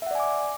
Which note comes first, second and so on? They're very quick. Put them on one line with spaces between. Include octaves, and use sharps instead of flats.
E5 F#5 D5 G#5 D6